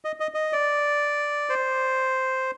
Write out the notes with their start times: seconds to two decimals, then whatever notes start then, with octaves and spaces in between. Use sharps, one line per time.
0.05 D#5
0.20 D#5
0.34 D#5
0.53 D5
1.49 C5